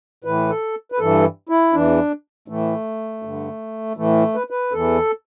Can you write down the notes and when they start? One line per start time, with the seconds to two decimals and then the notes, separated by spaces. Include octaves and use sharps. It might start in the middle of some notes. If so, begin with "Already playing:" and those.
0.24 A2 E3 B4
0.49 A4
0.92 B4
0.99 G2 E3 A4
1.49 E4
1.73 E2 E3 D4
2.48 A2 E3 A3
3.22 G2 D3
3.97 A2 E3 A3
4.35 B4
4.50 B4
4.72 E2 E3 A4